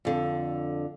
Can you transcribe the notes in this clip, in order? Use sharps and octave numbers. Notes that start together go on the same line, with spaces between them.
F2 D3